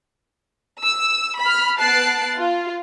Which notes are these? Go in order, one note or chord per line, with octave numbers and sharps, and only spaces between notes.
E6
B5 F6
B3 A5 F#6 A6 C7 D7
F4